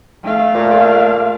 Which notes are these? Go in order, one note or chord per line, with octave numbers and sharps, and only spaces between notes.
A3 F5
A#2